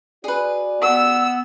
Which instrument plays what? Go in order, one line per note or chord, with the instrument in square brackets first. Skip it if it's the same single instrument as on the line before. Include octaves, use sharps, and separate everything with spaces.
[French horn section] F#4 D5 [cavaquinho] G#4 B4
[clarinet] B3 [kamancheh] E6